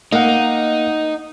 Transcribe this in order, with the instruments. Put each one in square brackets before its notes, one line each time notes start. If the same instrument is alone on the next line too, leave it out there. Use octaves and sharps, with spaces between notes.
[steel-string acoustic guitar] A#3 [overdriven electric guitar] D#4 [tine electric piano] D#5 F#5